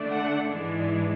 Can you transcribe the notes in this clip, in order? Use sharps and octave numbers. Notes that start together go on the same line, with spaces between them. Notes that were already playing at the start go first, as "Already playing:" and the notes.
Already playing: D3 A3 D4
F#5
G#2 E3 G#3 D4